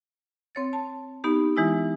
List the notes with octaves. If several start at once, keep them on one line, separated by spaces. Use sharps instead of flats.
C4 C#5 A6
A5
B3 D#4 G4
E3 G#3 E4 D#6